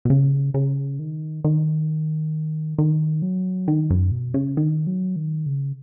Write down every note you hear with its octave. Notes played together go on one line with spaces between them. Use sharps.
B2
C#3
C#3
D#3
D#3
D#3
F#3
D#3
F#2
B2
C#3
D#3
F#3
D#3
C#3